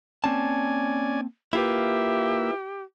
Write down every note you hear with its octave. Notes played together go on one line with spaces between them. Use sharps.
A#3 C4 C#4 D5 G#5 A5
A#3 E4 F4 G4 B4 E5